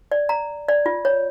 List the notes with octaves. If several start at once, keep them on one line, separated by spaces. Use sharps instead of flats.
D5
A#5
D5
F4
C#5